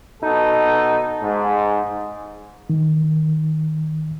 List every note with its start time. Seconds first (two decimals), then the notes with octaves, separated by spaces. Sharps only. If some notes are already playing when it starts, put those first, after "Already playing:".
0.23 B2 D#4 A4
1.21 G#2
2.70 D#3